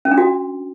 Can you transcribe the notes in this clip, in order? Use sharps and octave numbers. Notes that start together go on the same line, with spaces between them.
C#4
D4
F#4